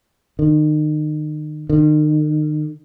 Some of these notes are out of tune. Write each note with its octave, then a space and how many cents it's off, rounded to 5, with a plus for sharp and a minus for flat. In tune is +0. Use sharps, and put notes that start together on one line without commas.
D#3 -35
D#3 -40